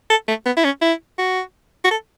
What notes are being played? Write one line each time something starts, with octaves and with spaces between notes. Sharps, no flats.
A4
A3
B3
E4
C#4
E4
F#4
F#4
A4